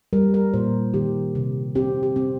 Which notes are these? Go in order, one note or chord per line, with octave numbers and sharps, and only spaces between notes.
G3 A#4
A#4
A#2 C5
D#3 G4
C3
C4 G4
G4
C4